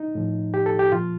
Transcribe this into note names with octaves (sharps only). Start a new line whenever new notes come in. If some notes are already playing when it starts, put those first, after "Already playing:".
Already playing: D#4
A2 F3
G4
A4
G4
A#2 F3 F4